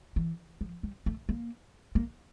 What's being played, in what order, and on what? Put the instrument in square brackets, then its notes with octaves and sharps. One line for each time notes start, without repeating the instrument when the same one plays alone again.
[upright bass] E3
F3
G3
A3
A#3
A#3